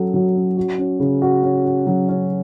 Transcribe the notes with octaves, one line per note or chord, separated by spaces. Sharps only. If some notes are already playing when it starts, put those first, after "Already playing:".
Already playing: F#3 C#4 A4
F#3
C#4
F#4
C#4
C#3
F#4
C#4
F#4
F#3
C#4